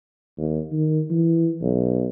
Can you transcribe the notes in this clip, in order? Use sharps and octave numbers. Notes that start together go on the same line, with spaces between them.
D#2
D#3
E3
B1